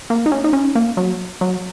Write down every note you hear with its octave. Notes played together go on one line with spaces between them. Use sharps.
A#3
D#4
C#4
D#4
C#4
A#3
F#3
F#3